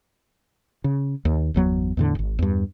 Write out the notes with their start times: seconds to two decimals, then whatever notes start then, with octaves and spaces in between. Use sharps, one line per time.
0.84 C#3
1.25 D#2
1.54 G1 E2 F#3 B3
1.97 E2 A2 D3
2.15 D1 G#1
2.39 E2 G2